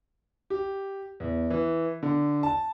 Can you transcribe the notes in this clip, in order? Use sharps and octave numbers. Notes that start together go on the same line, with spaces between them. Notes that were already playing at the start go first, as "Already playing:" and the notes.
G4
E2
E3
D3
A5